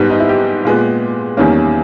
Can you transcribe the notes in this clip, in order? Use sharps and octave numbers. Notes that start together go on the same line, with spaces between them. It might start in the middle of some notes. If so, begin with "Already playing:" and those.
Already playing: G#2 G3 B3
D#4
E4
G4
A#2 G#3 B3
E2 D#3 G3 A#3 C#4